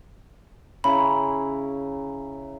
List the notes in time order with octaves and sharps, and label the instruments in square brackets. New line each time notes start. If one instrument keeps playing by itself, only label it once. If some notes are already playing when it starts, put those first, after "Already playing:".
[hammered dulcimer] C#3 E4 A#5 [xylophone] B5